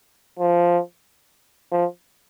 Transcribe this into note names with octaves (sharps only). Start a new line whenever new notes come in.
F3
F3